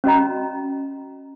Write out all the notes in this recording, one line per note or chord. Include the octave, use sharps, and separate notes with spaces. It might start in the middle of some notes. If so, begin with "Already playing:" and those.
C#4 F#4 D#5 A#5